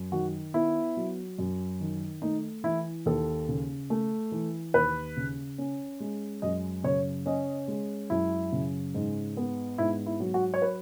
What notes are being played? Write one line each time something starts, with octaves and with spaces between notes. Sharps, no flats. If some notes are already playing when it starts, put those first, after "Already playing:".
Already playing: F#2
D#3 F#4
B3 E4
F#3
F#2
D#3
A3 D#4
E3 E4
D#2 A4
C#3
A3
E3
D#2 B4
C#3
C#4
G#3
F#2 D#5
C#3 C#5
C#4 D#5
G#3
F#2 E4
C#3
G#2
B3
G#2 E4
E4
F#3
F#4
C#5
B4